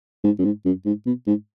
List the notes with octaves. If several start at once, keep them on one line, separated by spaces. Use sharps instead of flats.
G#2
F#2
G#2
F#2
G#2
B2
G#2